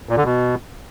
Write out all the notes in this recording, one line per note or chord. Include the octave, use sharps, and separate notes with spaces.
A#2
D3
B2